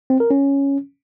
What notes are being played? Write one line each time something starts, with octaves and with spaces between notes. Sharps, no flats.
C4
A#4
C#4